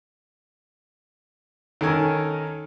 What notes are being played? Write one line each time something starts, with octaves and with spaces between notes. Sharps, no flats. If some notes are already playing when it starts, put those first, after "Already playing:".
D#3 C#4 A4 A#4 G#5